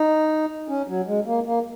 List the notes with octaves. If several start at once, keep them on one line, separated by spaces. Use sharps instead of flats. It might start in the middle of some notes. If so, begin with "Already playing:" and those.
Already playing: D#4
C#4
F#3
G#3
A#3
A#3